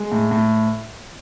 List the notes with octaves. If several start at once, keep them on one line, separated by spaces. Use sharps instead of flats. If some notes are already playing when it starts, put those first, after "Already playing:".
Already playing: G#3
A2
A2